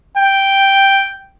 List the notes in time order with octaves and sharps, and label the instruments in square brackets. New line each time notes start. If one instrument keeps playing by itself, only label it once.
[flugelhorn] G5